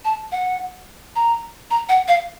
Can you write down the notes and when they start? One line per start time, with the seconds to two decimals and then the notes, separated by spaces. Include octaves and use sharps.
0.05 A5
0.32 F#5
1.16 A#5
1.71 A#5
1.89 F#5
2.08 F5